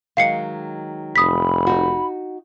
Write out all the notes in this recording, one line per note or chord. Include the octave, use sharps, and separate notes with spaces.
D#3 F#3 G#3 F5 C7 C#7
F1 B5 D#6 B6
D#4 F#4